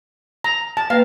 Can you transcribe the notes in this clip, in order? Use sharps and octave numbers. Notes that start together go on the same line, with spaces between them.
A#5
A5
A#3 B4 F5 G5